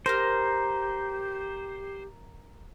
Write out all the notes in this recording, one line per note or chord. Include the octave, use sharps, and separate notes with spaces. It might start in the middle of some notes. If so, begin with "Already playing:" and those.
G4 A#4 C5 A#5 F6